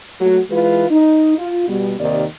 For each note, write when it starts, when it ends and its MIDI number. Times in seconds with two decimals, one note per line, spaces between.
0.21 0.41 54
0.21 0.41 57
0.21 0.41 66
0.50 0.85 52
0.50 0.85 56
0.50 0.85 65
0.50 0.85 71
0.90 1.37 63
1.38 1.65 65
1.68 1.94 47
1.68 1.94 55
1.99 2.24 39
1.99 2.24 48
1.99 2.24 51
1.99 2.24 74